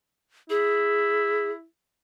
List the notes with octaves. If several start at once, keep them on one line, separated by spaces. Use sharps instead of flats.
E4 G#4